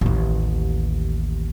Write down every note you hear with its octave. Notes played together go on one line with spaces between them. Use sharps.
A1 D#2